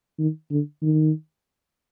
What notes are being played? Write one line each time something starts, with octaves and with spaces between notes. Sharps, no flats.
D#3
D3
D#3